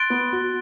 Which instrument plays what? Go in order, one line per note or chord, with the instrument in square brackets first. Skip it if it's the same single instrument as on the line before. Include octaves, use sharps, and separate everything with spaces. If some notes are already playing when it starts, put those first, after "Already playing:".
Already playing: [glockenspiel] C6 F#6 A6 D7 G7
[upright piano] B3
F#4